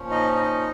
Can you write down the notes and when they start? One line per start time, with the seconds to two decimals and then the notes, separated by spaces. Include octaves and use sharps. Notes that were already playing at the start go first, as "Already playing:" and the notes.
Already playing: A#2 F3 C#4
0.10 D#4 D#5
0.35 D#4 D#5